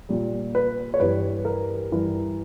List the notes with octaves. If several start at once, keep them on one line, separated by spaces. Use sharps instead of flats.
A#2 G3
B4
C#5
G2 E3 G3 B4
A#4
G2 E3 G3